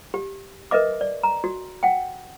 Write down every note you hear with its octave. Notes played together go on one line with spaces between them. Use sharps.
G4
A#4 B4 D#5 E5 D6
D5
A#5
F#4
F#5 G5